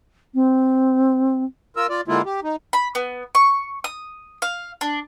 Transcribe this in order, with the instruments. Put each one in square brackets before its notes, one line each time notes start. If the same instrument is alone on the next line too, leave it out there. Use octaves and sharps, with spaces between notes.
[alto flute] C4
[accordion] F4 A#4 E6
F4 D5
D3 G#3 A#3 E4 F4
G4
D#4
[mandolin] B5
B3
C#6
D#6
F5
D4